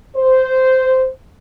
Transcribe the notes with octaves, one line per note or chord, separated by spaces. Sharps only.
C5